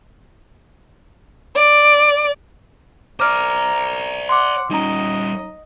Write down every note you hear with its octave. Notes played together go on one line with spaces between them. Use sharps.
D5
C5 D5 A#5 D6 F6
F#5 C6 D6
G3 C#4 D#4 D#5 A#5